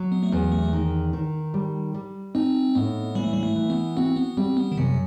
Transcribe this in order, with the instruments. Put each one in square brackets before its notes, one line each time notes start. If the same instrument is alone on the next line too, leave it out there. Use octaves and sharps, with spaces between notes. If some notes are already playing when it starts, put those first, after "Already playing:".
Already playing: [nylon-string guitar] F#3
[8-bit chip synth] B3
A3
[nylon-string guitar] E2 [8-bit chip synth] B3
[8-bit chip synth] A3
[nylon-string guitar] D#3
D#3
G3
G3
[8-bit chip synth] C4 [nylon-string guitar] D#4
[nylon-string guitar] A2 [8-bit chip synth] B3
[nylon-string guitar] E3 [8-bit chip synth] G3
[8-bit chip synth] A3
G3
A3
[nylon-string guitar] E3
[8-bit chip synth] B3
[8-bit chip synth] C4 [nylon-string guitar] F#4
[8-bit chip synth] B3
[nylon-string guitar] G3 [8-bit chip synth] C4
[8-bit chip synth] B3
D#3
[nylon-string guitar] F#2 [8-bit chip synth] C3